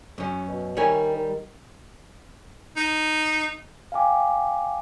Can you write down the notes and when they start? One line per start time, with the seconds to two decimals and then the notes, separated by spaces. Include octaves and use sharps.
0.18 F#2 C#4
0.48 B2
0.77 D#3 G3 C#5 G#5
1.15 D#3
2.77 D#4
3.92 F5 G5 G#5 D6